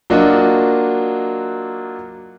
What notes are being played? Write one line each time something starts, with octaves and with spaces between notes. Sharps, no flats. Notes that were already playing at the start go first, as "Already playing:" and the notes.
F#3 A#3 D4 F4 F#4 D#5